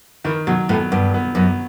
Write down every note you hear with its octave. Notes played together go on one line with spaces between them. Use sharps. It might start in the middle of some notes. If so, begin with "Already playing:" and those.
D#3 E3
B2 F#3
A2 B3
G2 B3
B3
F#2 B3